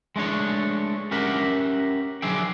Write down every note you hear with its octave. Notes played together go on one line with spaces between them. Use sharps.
G#3 A3 D4 C#5
C#4 G4 A#4 E5 F#5
D3 F#3 G#4 D5 E5 G5